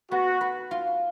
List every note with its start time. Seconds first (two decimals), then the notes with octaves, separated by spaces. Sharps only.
0.12 B3 F#4
0.41 B4
0.71 F4